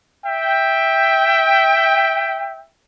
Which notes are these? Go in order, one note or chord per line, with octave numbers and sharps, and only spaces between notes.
E5 G5